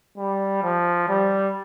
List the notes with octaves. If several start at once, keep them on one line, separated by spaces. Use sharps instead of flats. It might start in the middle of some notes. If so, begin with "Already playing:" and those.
G3
F3
G3